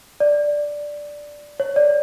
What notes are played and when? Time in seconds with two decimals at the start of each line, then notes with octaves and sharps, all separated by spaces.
0.20 D5
1.60 C#5
1.76 D5